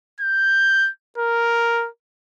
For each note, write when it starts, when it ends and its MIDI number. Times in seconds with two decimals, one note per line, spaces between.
0.20 0.90 91
1.18 1.88 70